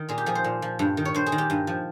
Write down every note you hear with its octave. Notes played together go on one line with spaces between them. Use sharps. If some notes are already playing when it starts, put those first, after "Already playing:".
Already playing: D#3
A#2 G#4
G4
F3 G#4
C5
A#2
F3
G2
D#3
C#5
G2 C5
G#4
D#3
G4
G2
F3